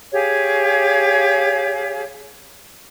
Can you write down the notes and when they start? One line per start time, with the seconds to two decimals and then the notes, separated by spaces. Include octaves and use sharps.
0.12 G4 G#4 C#5 F5